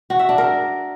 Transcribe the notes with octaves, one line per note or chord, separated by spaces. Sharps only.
F#4
E5
D4
A#4